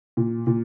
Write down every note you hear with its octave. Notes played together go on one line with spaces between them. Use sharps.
A#2
A#2